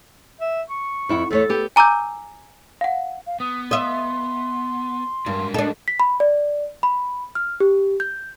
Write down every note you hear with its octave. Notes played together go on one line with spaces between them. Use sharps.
E5
C#6
F2 E4 F#5
E2 A3 A4 C#5
B3 G4
G#5 A#5 D6 E6 G6
F5 F#5
F5
B3 D#6
D#5 E5 C6
G2 F#3 G#3 A#4
D4 A4 D#5
B6
B5
D5
B5
F6
G4
G6